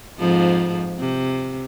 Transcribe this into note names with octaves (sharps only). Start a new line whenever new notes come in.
F2 G#2 F3
C3